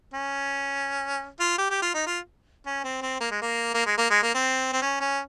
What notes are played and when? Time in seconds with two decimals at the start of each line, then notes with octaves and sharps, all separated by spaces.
0.14 C#4
1.40 F4
1.58 G4
1.70 G4
1.82 F4
1.94 D#4
2.07 F4
2.66 C#4
2.84 C4
3.02 C4
3.20 A#3
3.31 G#3
3.42 A#3
3.74 A#3
3.86 G#3
3.98 A#3
4.11 G#3
4.22 A#3
4.35 C4
4.73 C4
4.82 C#4
5.00 C#4